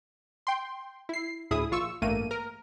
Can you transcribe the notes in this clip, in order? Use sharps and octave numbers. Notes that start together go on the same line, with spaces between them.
G5 C6
E4 C7
D2 A2 E4 G#4 D#6
A#1 F4 C#6 E6
A1 G2 A3 A#3 D#7
A#4